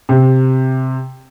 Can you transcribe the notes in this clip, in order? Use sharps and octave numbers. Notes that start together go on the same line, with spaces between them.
C3